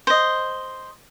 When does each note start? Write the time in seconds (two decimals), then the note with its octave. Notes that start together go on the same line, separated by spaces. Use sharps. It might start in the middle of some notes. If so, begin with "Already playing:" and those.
0.07 C5 D#5